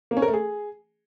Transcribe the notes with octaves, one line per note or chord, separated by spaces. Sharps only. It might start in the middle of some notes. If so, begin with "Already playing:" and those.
A#3
C#4
A#4
A3
G#4